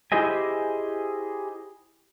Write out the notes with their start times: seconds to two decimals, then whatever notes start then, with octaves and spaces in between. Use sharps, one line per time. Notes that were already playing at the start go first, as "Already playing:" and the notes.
0.12 E4 G4 G#4 C5 D#5 G#5